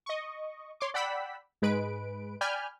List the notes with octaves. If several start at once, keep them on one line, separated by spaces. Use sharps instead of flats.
D#5 C#6
C#5 C6 D6
D5 F#5 G5 B5 E6 B6
G#2 G#3 B4 D7
D5 G5 G#5 B5 F6 G6